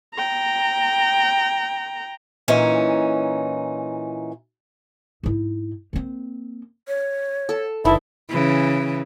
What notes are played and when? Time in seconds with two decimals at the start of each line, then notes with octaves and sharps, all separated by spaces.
0.15 G5 A#5
2.48 A#2 E3 C#4 D#4
5.23 G#2 E4
5.93 A#3 C4
6.88 C#5
7.49 A4 A5
7.85 F#1 D3 E3 D#4 E4 A5
8.30 C#3 E3